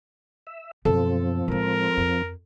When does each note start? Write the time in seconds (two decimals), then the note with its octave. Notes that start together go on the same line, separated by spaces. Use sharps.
0.47 E5
0.85 F#2 B2 F3 C4 A4
1.48 A2 G#3 A#4
1.97 F2